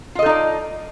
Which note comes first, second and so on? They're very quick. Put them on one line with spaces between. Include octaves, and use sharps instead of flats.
F4 D#5 A4 D#4 D5